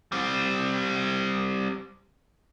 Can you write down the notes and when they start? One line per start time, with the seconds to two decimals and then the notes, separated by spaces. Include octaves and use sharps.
0.12 G3 C4